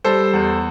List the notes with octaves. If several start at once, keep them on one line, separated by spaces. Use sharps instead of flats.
G3 A4 C5
E2